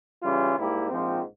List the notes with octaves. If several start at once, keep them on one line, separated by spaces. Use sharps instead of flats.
C#3 E3 G3 C#4 F4
G#2 G3 A#3 E4 G4
A#1 G#2 F3 C4